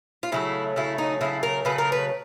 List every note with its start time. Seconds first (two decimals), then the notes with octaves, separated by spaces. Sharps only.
0.23 F4
0.32 C#3 F#3 A3 E4
0.76 C#3 F#3 A3 E4
0.98 D#4
1.21 C#3 F#3 A3 E4
1.43 A#4
1.65 C#3 F#3 A3 B4
1.78 A#4
1.92 B4